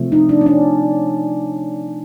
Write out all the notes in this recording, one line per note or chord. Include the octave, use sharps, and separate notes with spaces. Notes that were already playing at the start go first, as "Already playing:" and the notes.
Already playing: C3 F3 A3
D#4
D4
C#4
D4